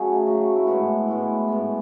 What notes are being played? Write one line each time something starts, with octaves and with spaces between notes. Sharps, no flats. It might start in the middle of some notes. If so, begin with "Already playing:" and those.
Already playing: C#3 F#3 A3 G#4
C#3 F#3 A3 F#4
E4
A2 G#3 B3 F#4
A2 G#3 B3
A2 G#3 B3